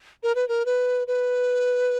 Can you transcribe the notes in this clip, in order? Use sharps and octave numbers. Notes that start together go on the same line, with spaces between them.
A#4
B4
A#4
B4
B4